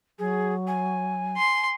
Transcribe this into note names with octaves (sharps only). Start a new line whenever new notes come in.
F#3 G#4
G#5
C6